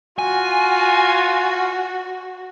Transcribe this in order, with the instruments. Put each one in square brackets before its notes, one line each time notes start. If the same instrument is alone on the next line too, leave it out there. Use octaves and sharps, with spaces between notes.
[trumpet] F4 [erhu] F#4 [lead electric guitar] G#5